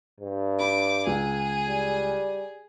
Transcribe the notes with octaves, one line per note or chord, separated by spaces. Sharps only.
G2
B5 D6
C#2 G#4
G3